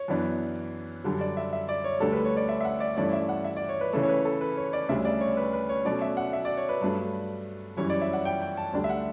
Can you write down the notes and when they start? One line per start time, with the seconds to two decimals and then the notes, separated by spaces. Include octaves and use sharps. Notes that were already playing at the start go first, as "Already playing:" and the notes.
Already playing: C#5
0.08 F#2 E3 B3 D4
1.04 F#2 D3 G3
1.21 D5
1.37 E5
1.53 E5
1.69 D5
1.84 C#5
2.00 D2 D3 G3 A4
2.12 B4
2.25 C#5
2.37 D5
2.49 E5
2.61 E5
2.65 F#5
2.80 D5
2.97 G2 E3 A3 C#4 D5
3.13 E5
3.29 F#5
3.44 E5
3.56 D5
3.69 C#5
3.81 B4
3.93 C#3 E3 A3 C#4 A4
4.03 C#5
4.09 B4
4.25 A4
4.41 B4
4.57 C#5
4.73 D5
4.89 D2 C#3 G3 D4 E5
5.05 D5
5.21 C#5
5.37 B4
5.53 B4
5.69 C#5
5.85 B2 F#3 A3 C#4 D5
6.01 E5
6.17 F#5
6.33 E5
6.45 D5
6.57 C#5
6.69 B4
6.81 G2 F#3 A3 D4
7.77 F#2 E3 G3 C#4 C#5
7.89 D5
8.02 E5
8.13 F#5
8.25 G5
8.42 G5
8.57 A5
8.74 D2 D3 G3 D4
8.84 E5
8.90 F#5